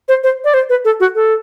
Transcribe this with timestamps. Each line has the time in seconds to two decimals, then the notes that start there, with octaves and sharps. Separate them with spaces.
0.08 C5
0.24 C5
0.44 D5
0.54 C5
0.69 B4
0.85 A4
1.00 F#4
1.15 A4